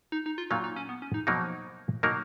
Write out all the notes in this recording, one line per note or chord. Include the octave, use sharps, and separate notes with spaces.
D#4
D#4
F4
A#2 F#3 A#3 D#4 F4
D#4
C#4
B3
C#4
D#4
B2 F3 F#3 A#3 D#4 A#4
B2 F#3 A#3 D#4 A#4